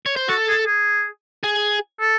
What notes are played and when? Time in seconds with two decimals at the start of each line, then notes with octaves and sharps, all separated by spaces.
0.06 C#5
0.16 C5
0.28 F#4 A4
0.48 G#4
0.66 G#4
1.44 G#4
2.00 A4